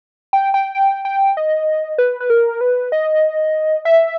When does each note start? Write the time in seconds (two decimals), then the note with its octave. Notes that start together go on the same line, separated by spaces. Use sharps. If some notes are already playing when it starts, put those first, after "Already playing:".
0.33 G5
0.54 G5
0.75 G5
1.05 G5
1.37 D#5
1.98 B4
2.20 B4
2.30 A#4
2.61 B4
2.92 D#5
3.85 E5